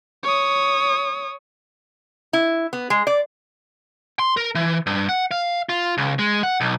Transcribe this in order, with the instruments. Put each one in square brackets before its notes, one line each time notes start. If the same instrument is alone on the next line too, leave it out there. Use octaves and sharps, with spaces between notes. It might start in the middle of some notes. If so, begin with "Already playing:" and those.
[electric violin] C#5 D#6
[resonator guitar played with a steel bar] E4
B3
G#3
D5
[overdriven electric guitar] C6
A#4
E3
G2
F#5
F5
F4
C#2
G#3
F#5
B1